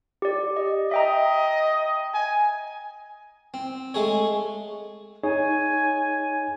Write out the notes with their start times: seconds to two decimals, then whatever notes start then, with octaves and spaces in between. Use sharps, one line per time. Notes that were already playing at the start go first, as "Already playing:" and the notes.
0.22 G4 D5
0.56 D#5
0.91 D#5 E5 G5 A#5
2.14 G#5
3.54 C4
3.94 G#3 A3 G#4 C#5
5.24 D#4 G#4 C#5 G#5